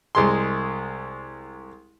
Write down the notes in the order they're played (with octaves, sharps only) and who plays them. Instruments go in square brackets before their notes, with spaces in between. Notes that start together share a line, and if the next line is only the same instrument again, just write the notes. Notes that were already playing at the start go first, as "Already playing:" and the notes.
[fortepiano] C2 G#3 C6